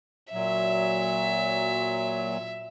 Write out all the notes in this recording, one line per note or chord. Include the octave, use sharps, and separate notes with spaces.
A#2 F#3 E5